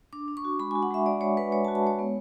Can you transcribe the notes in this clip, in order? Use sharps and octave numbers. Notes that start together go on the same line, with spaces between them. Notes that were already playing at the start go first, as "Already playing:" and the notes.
D4 D6
D4
C#6
F#4
G#3 B5
G#5
F#4
F#5
G#3 E5
G#3 D5
G#3 C#5
G#3 B4
G#3 C#5
A5
F#4
A5
G#3 C#5
B3